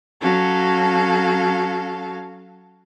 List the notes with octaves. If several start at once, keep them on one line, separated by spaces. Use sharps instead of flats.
F#3 C#4 F#4 A4 F5